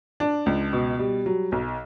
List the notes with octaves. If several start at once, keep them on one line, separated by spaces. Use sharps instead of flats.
D4
C#2
B2
G3
F#3
B1